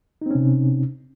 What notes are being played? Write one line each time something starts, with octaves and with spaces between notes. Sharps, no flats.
C3 C4 C#4 D#4